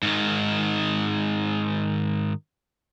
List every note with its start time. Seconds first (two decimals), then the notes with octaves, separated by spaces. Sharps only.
0.03 G#2 D#3